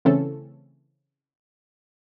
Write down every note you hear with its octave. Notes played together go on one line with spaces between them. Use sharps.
C#3 E3 A3 C4 C#4 A4